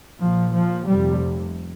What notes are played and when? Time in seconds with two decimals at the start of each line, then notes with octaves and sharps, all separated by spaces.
0.20 A#1 A#2 F3
0.54 F3
0.86 F1 F2 C3 G3